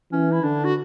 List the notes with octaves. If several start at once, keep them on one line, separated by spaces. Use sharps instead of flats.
E3 C#4
E4
D3 D4
F#4